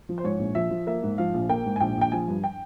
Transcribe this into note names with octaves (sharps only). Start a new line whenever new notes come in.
F3
C5
G#2 C#5
A#1
F3 E5
F3
A#3 E5
G#2
F3 F5
A#1
A#3 G5
G#2
G#5
A#1 G5
A#1 G5
F3 G#5
G2
G5